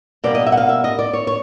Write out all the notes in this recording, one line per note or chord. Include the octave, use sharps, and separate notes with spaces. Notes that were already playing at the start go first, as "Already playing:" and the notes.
B2 G3 A#3 D5
D#5
E5
F#5
F5
E5
D#5
D5
C#5
C#5